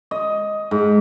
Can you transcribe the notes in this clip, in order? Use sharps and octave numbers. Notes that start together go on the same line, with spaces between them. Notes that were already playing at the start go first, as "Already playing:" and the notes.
D#5
G#2